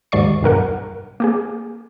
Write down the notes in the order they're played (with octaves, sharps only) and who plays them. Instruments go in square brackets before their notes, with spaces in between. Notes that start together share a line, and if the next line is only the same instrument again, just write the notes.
[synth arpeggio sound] D#2 G#2 D5 C#6 C7
B1 G2 A#4 F#5
A#3 G4 G#4